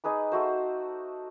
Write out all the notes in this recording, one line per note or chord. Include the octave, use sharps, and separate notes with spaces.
D#4 G#4 B4 D6
A3 F#4 C5